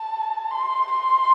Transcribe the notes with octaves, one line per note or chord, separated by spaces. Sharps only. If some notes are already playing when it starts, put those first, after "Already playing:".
Already playing: A5
C6
C6